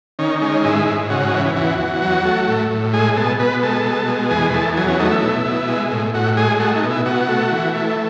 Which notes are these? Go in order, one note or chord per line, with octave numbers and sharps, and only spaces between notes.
D#3 C#4
G#3 C#4
G#2 E4
G#2
C#3 F#4
E3
E2 F#4
E2
F#3
A3
A2
A2
G#3 G#4
B2 A4
B2 B4
G#3 A4
B2
G#3
E2 G#4
B4
E2 A4
F#3 G#4
C#4
A3 D#4
E4
B2
B2
G#3
A2
A2 F#4
G#3 G#4
A3 F#4
D#4
B2
E4
B2 F#4
A3
E3
A3